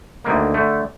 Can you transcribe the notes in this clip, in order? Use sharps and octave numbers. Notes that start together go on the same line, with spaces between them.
D2 D3 D#3 A#3
D3 A3